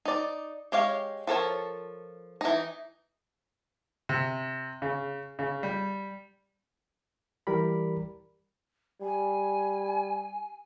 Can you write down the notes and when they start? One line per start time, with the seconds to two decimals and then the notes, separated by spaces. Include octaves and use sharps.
0.05 D#4 D5
0.72 G#3 G4 C#5 F5
1.27 F3 A4 A#4 C#5
2.41 E3 D#4
4.09 C3
4.82 C#3
5.39 C#3
5.63 G3
7.47 E3 G3 G4 A#4 D5 B5
9.01 G3 G#5